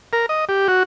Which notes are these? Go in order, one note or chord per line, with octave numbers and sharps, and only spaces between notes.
A#4
D#5
G4
F#4